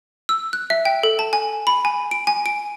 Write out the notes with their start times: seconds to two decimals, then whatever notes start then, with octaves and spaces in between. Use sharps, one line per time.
0.29 E6
0.53 F#6
0.70 E5
0.85 G5
1.03 A4
1.19 A5
1.33 G#5
1.67 B5
1.85 G#5
2.11 D7
2.27 G#5
2.46 D7